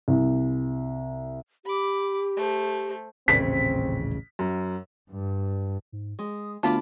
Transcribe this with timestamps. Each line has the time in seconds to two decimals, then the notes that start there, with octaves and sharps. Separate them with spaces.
0.08 C2
1.65 G4 B5 D6
2.37 A3 C5
3.28 D#1 A1 C#3 C4 B6
4.39 F#2
5.11 G2
5.92 G#2
6.19 G#3 D#6
6.63 D2 B3 F4 A5 B5 D6